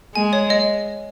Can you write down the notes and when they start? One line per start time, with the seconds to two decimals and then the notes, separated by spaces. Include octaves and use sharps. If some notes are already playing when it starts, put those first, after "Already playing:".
0.15 G#3 G#5
0.33 C#5
0.50 D#5